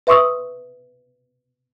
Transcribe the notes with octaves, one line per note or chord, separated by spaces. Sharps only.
B4 E5 C6 C#6 D#6 E6